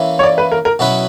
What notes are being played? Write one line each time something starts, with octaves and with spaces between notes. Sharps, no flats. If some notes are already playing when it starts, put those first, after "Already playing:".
Already playing: E3 A#3 C#4 E4
C#5
D5
B4
A#4
A#4
B2 F#3 C#4 E4 B4